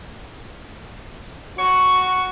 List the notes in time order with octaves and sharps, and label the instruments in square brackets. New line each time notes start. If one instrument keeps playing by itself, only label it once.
[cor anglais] F#4 [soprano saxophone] C#6